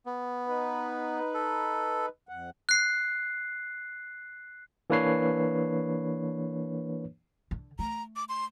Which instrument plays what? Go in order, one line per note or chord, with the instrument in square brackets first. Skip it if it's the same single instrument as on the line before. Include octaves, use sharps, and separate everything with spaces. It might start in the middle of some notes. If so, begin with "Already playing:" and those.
[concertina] B3
[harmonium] D#4 B4
[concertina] A4
[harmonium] F2 F#5
[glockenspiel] F#6 C7
[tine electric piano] E3 A#3 D4 B4 C#5 C7
[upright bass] D3
[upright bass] A3 [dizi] A#5
[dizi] D6
C6